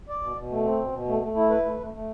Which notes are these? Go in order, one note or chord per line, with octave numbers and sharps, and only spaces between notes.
D5
B2
B2
A3
C4
B2
B2
A3
A3
E4
B4
A3
A3
A3